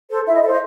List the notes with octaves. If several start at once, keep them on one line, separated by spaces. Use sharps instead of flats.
A4 C5
E4 E5
D#5
A4 C5 D#5 E5